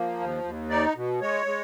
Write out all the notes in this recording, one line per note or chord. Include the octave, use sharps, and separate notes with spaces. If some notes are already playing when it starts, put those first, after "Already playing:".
Already playing: F3 A#3
D#2
D#2
D#4 D5
B2
G#3 C#5
G#3